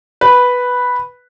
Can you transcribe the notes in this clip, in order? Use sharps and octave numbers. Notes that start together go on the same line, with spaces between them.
B4